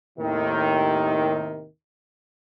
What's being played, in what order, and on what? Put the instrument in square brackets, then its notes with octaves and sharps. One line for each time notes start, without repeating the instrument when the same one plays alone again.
[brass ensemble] D#2 A2 C3 D#3